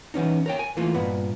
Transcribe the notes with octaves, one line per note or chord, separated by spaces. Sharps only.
E3 B3 C#4 D#4
A#4 C#5 G5
G#5
E3 A3 A#3 F4
G2 A#2 B3